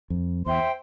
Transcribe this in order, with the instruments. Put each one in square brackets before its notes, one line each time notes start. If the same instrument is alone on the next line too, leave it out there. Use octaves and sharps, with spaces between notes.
[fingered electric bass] F2
[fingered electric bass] E2 [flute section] C5 E5 G5 C6